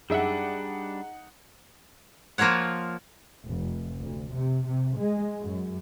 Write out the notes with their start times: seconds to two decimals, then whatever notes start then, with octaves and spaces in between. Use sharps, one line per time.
0.10 F#2 G3 D4 D#4 G#4 E5 F#5
2.38 F3 A#3 F4 C#5 F#5
3.47 F1
4.01 D2
4.33 C3
4.66 C3
4.99 G#3
5.41 F#2